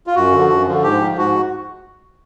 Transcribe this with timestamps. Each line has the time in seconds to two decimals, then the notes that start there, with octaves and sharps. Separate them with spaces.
0.07 F4
0.15 F#2 F#4
0.32 D3
0.38 F3
0.49 F#2
0.67 D3 F3
0.83 G#2 G4
1.01 F3
1.17 G#2 F#4